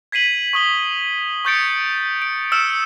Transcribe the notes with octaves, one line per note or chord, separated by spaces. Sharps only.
G#6 B6 C7 D#7 F#7
C#6 D#6 G7
C#6 D#6 G6 A6 C#7 D7
D7
E6 F6 C#7 E7